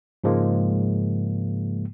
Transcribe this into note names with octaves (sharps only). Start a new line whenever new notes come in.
G#2 C#3 F3 G#3 A#3